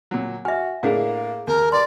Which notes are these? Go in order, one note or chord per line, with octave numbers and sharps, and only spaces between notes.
A#2 F#3
F#4 E5 G#5 F6
A2 A#3 D4 G#4 A#4 F5 F#5
D#2 A#4
G2 D5 C6